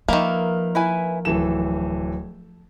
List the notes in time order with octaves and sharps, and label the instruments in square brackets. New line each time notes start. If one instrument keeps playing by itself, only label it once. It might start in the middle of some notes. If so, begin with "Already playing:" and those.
[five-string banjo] D#3 A#3 [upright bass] F3 [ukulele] B4 E5
[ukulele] E4 B4 G#5
[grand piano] D1 E3 E7 [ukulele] A4